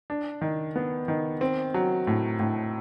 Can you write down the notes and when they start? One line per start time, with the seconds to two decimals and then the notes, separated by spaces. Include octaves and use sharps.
0.10 D4
0.41 D#3
0.76 B3
1.08 D#3
1.41 C4
1.74 F#3
2.07 A2
2.39 A2